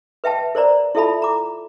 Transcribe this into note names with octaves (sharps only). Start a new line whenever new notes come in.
B4 E5 G5 A5
A#4 C5 D5 A#5
E4 F4 A4 E5 A5 B5
A#5 D6